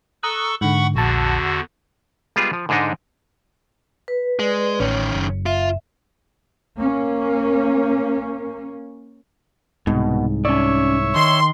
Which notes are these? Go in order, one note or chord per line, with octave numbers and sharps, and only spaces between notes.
A4 A#5 C#6 D#6 E6 F#6
G#2 D3 F#5 B5 C#6
A#1 E2 D3 F#4 A5
G3 G#3 B3 F4 G#4
F3
G#2 D3 G#3 D4 D#4
B4
G#3 B4 D5
A1 D#3 C#4 C#5
F#1
F4 E5
A#3 C#4
C2 G#2 B2
C#4 C#5 D5 E5
D#3 C6